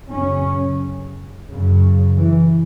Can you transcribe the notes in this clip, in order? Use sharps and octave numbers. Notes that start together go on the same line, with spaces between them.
F#2 C#3 C#4
F#2 C#3
E3